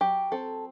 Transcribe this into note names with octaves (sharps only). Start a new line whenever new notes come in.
F#3 G4
C4 A4